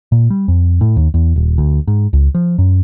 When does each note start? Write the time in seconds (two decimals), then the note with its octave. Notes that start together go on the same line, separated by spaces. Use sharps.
0.12 A#2
0.30 G3
0.48 F2
0.81 A2
0.97 D#2
1.14 E2
1.36 D#1
1.58 D2
1.88 G#2
2.13 C#2
2.35 F3
2.58 F#2